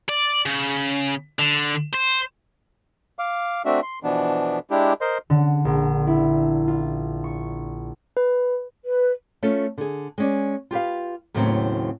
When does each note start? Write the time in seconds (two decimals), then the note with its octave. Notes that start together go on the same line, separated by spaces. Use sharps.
0.09 D5
0.45 C#3
1.39 D3
1.94 C5
3.19 F5 D6
3.65 A3 C4 D4 F#4 E5
3.82 C6
4.03 B2 E3 F3 B3 D4
4.70 G#3 D4 E4 G4
5.01 A#4 C5 D#5 C6
5.30 D3
5.65 A#1
6.07 E4
6.68 F4
7.24 C#6
8.17 B4
8.85 B4
9.42 A3 C#4 F4 A4
9.78 D3 G#4
10.18 G#3 C#4 D5
10.71 F4 G4 B4 F5
11.34 D#2 A2 C#3 F#3 B3 C4